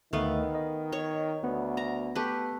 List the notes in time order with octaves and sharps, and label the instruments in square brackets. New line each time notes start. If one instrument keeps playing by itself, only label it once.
[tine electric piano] D2 A3 [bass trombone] D#3 [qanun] B3 F5
[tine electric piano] D#5
[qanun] C#5
[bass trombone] D2 [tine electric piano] B3
[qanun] A#5
A3 G4 B4